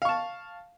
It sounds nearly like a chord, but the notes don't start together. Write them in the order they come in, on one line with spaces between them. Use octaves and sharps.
F5 C#6 A5